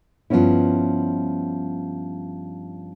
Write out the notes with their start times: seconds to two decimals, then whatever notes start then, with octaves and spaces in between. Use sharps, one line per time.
0.30 G2 F3 A#3 B3 C#4 E4